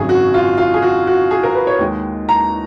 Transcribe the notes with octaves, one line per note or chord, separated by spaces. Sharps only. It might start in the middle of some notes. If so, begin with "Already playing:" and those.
Already playing: G#1 F#2 C#3 F#3 G#4
F#4
F4
F4
G#4
F#4
F#4
G#4
A#4
B4
C#5
D#2 D#3 G#3 D#4
A#5